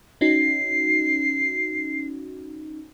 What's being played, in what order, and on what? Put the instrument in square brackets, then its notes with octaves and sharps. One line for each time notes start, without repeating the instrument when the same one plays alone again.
[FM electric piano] C#4 D#4 F#4 [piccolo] C7